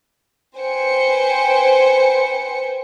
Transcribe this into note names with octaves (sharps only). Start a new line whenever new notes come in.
B4 C5 G5 G#5 C#7